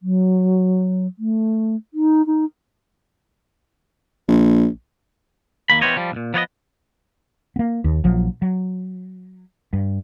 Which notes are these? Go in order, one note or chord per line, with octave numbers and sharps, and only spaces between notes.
F#3
A3
D#4
D#4
A#1
D#2 A#3 B5
E3 G3 B3 C5 C#5 D#5
F3 G3
B1 A#2
F3 B3 C#5 D#5
A#3 B3
D#2
A#1 F3 F#3
F#3
G2